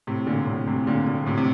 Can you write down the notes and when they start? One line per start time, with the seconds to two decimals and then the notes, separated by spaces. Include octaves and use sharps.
0.07 A2 C3
0.27 A#2 D3
0.47 A2 C3
0.68 A2 C3
0.87 A#2 D3
1.06 A#2 D3
1.26 A2 C3
1.37 C3